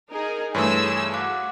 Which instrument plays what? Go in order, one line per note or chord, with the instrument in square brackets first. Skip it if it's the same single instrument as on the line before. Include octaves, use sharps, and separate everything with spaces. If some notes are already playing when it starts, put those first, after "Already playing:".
[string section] D#4 G#4 A#4
[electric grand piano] G2 E3 A3 [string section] G#4 E6 [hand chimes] C#5 C6 D#6
[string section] F#4 [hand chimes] F5 D6 F#6